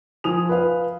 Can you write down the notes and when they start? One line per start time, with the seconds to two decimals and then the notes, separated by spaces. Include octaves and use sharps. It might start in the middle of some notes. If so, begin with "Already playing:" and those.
0.24 F3 G#5 D#6 F7
0.49 B4 F5